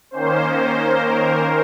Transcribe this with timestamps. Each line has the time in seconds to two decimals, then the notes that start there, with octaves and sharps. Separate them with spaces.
0.11 D#3 A#3 C#4 C5
0.45 C5
0.77 A#4